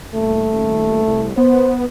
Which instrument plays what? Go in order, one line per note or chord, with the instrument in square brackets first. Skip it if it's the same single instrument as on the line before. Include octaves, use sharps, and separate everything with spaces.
[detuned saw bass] D#1 [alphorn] A3
[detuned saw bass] C2
[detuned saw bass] B3 [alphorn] C5